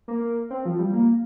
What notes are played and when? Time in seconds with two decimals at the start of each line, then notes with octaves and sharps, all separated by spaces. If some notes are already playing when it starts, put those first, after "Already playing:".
0.08 A#3
0.50 C4
0.65 F3
0.79 G3
0.93 A#3